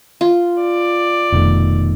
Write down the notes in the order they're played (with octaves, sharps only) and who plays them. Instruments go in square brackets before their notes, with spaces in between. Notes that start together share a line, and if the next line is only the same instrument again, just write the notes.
[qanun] F4
[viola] D5
[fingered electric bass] F1 [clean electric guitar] B2 D#3 A3